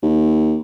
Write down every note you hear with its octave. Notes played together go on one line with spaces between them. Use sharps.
D#2